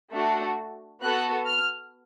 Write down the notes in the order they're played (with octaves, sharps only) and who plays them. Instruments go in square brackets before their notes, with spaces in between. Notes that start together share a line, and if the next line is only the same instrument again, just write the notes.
[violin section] A3 D4 F#4 A4
B3 F#4 A4 F#6
F6